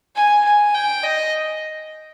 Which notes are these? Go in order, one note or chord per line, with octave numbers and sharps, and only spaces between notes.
G#5
G#5
G5
D#5